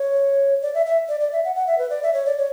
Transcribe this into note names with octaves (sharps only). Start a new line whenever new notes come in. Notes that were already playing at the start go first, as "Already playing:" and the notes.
Already playing: C#5
D5
E5
E5
D5
D5
E5
F#5
F#5
E5
B4
D5
E5
C#5
D5
C#5